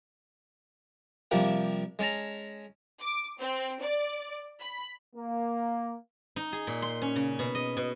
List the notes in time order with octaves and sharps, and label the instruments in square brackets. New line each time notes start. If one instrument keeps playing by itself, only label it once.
[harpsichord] C3 F3 G3 A#3
G#3 C#4 A5 A#5
[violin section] D6
C4
D5
B5
[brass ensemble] A#3
[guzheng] D#4
G#4
A#2
C6
C#4
C#3
B2
D#5
B2